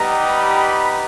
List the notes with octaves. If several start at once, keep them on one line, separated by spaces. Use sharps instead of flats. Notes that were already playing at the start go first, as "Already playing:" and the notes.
Already playing: G3 B3 D#4 G4 A#5
B5
B5